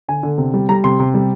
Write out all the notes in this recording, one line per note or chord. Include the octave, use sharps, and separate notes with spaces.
D3 G#5
D3
C3
G3
G3 A#5
C3 C6
C3
G3